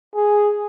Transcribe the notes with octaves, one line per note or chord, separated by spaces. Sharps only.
G#4